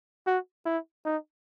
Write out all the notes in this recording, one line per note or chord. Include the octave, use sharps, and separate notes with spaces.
F#4
E4
D#4